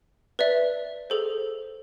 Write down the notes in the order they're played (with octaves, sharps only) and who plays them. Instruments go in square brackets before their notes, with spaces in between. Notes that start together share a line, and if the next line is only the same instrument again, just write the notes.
[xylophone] B4 D5 E5
G#4 A4 C5